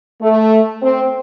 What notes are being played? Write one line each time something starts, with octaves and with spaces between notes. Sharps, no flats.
A3
C4